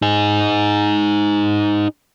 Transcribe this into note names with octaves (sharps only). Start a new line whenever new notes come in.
D#4 G#4